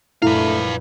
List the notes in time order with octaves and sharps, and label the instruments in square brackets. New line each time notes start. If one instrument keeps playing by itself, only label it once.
[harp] A#1 F#2 A#2 [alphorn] A3 [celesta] E4 [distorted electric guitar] B4 F5